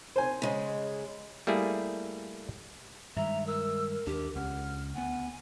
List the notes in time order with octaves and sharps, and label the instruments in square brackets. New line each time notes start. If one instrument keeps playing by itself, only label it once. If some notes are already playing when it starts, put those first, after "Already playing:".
[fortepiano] C5 G#5
[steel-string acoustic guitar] C#3 G#3
[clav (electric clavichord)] G3 A3 A#3 E4 G#4
[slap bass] G2 D#3 G#3 [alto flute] E5 [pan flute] A#5
[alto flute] A#4 [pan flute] E6
[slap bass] D#2 D4 [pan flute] G4
[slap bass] C#2 C#4 [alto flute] F#5 [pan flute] F6
[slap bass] D2 B3 [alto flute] F#5 [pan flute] G#5